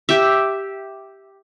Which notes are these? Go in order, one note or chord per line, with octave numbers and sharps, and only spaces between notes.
G4 E5